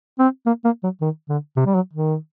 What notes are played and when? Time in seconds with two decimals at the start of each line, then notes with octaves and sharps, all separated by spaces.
0.19 C4
0.46 A#3
0.65 A#3
0.83 F#3
1.01 D#3
1.29 D3
1.56 C3
1.66 G3
1.75 F#3
1.94 D#3